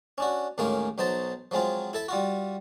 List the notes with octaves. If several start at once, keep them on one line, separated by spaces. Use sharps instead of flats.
C#4 D4 F#4
D#2 A2 G#3 A#3 C#4 F5
B1 F#3 D#4 C5 A5
F3 F#3 G#3 C4 F4
E4 A4 E5
G3 F4 F#4